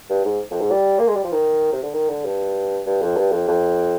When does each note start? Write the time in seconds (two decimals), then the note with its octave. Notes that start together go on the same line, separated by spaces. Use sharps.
0.10 G2
0.25 G#2
0.51 F2
0.60 G#2
0.71 G3
0.99 A#3
1.07 G#3
1.15 G3
1.24 F3
1.32 D#3
1.73 C3
1.83 D3
1.94 D#3
2.09 D3
2.25 G2
2.86 G2
3.02 F2
3.17 G2
3.32 F2
3.48 F2